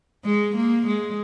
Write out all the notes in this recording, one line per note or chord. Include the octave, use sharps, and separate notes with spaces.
G#3
A#3
G#3